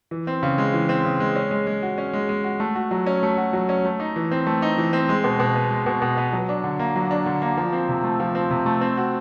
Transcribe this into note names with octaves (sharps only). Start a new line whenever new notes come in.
E3
C4
C#3
G#3
E3
C4
C#3
G#3
C#4
G#3
G#3
F#4
C#4
G#3
G#3
F#4
A3
F#4
F#3
C#4
A3
F#4
F#3
C#4
A3
D#4
E3
C4
A3
D#4
E3
C4
G#3
B2
B2
B3
G#3
B2
B2
B3
F#3
D4
D3
A#3
F#3
D4
D3
A#3
F3
C4
C3
A3
F3
C4
C3
A3
C4
F#4